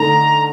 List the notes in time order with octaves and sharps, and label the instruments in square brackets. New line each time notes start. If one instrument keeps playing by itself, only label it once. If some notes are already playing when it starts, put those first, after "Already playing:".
Already playing: [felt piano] D3 A3 D#4 [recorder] A#5